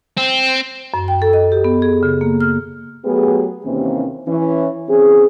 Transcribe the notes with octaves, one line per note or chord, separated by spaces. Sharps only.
C4
F#2
G5
A4
D#5
G4
B3
G#4
C#3
A#3
F6
F#3 A3 B3 G4 G#4
D#2 C3 E3 A#3 C4 C#4
E3 C#4
E3 C4 C#4 G#4